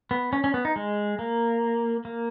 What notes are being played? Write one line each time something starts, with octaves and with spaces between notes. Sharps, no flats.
B3
C#4
C#4
B3
D#4
G#3
A#3
A#3